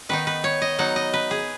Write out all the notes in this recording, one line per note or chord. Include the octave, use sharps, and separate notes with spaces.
D#3 B3 D#4 B4
B4
C#5
D#5
F#3 B3 D#4 F#5
D#5
B4
G#4